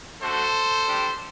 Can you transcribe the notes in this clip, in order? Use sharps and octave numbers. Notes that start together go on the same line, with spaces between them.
A3 D4 F#4 A4 C5
G3 D4 G4